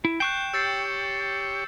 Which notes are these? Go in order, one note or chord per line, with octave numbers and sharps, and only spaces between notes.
E4
G5 C#6 F#6 G6 C7 E7
G4 C#5 E6 A6 C7